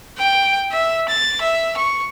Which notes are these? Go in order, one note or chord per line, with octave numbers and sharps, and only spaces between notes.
G5
E5
A6
E5
C#6